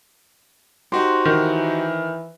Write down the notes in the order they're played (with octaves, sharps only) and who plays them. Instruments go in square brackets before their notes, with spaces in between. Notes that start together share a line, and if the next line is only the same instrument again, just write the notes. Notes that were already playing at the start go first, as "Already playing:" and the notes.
[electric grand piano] D#4 F#4 G4 [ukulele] C5
[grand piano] D#3 [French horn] E3